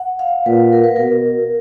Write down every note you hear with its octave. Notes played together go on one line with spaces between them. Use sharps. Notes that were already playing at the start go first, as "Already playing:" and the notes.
Already playing: F#5
F5
A#2 B4
A#4
B4
B2 A#4